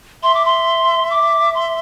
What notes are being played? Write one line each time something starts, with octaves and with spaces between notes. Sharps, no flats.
E5 C6
D6
C6
D6
C6